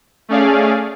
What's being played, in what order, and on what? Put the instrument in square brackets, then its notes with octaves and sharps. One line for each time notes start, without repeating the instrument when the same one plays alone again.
[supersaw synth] A3 C#4 G#4 D5 F5